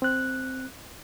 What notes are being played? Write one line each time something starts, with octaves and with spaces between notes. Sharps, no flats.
C4 F#6